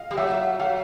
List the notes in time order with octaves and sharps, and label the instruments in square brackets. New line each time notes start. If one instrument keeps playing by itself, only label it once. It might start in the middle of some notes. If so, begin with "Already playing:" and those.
Already playing: [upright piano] D#5 F5
[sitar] G3
[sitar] F#3 [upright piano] E5
[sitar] F#3 [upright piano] F5